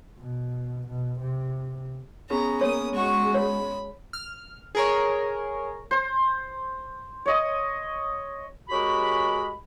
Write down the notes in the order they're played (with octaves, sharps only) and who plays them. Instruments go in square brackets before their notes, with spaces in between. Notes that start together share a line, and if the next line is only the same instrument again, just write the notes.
[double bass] B2
B2
C3
[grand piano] B3 C#4 G#4 [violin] A#5
[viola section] A#3 [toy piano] C#5 [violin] D#6
[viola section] G#3 [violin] F#4 C#6
[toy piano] C#5 [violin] B5
[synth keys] F6
G#4 A#4 C#5
[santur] C5
C#5 D#5 D#6
[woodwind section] G#3 C#4 F#4 G4 A#4 B5